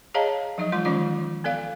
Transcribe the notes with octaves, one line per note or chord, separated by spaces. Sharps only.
G#4 C#5 D#5 F5 A5 A#5
F3 F#3 D#4 D#5
E3 G#3 F4 C6
D#3 F3 C#4 F4 D5 D6
B3 A4 D5 F5